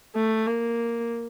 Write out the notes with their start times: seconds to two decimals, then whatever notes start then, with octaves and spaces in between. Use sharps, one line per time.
0.16 A3
0.47 A#3